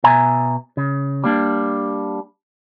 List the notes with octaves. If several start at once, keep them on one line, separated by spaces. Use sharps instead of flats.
B2 E5 G#5 A#5
C#3
G3 A#3 D4